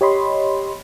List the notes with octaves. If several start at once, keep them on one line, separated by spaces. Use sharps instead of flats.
G4 C#5 D#5 B5 C6